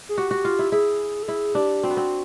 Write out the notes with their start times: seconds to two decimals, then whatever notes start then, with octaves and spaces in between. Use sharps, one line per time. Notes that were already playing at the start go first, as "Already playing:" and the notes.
0.09 G#4
0.18 F#4 G4
0.31 F#4
0.45 F4
0.59 E4
0.72 E4 G#4
1.23 A4
1.28 E4 G#4
1.55 D4 G4
1.83 C4 F#4
1.90 B3
1.97 C4